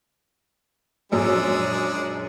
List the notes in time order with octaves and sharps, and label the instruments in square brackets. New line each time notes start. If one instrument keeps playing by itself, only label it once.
[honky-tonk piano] A#1 F#2 E6 [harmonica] G#3 D4